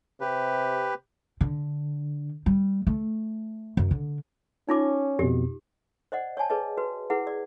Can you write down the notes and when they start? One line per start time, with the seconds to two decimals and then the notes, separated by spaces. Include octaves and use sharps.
0.21 C3 G4 B4
1.41 D3
2.46 G3
2.87 A3
3.77 F#2
3.91 D3
4.69 C#4 D#4 F4 D6
5.19 F2 B2 G4
6.12 C5 D5 D#5 F#5
6.37 C#5 D5 G#5 A5
6.50 G#4 B4 C#5 D#5 A5
6.77 F#4 B4
7.10 E4 G#4 B4 F#5
7.27 D5